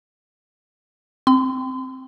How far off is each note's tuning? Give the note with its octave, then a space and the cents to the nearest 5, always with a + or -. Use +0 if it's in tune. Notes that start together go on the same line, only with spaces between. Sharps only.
C4 +0 C6 -40